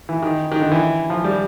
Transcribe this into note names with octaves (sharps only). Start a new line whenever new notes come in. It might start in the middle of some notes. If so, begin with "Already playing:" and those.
E3
D#3
D#3
D3
E3
F3
G3